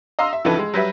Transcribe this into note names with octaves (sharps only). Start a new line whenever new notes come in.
D#5 F5 A#5 C6 E6
E5
C#2 E3 F3 D#4 A4 B4
G#3
F#3 G3 B4 E5